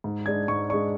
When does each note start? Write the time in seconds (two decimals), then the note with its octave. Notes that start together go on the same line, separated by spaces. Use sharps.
0.04 G#2
0.26 G#3 D4 G#6
0.48 G#2 C#6
0.69 G#3 D4 C#6